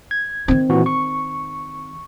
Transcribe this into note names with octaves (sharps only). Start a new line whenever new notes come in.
G#6
D#3 C4
A#2 E3 F#4
C#6